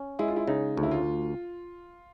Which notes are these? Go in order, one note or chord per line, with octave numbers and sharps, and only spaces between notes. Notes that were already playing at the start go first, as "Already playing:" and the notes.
Already playing: C#4
G#3 E4
F4
E4
C#3 D#4
D2
E4
F4